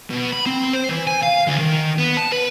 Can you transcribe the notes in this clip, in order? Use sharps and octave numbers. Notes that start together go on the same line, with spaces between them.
B2
B5
C4
C5
E3
G#5
F5
D2
D#3
B3
A5
B4